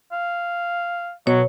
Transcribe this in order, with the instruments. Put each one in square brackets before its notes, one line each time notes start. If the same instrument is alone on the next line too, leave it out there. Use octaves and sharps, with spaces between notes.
[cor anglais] F5
[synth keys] B2 [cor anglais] F#3 [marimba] C#5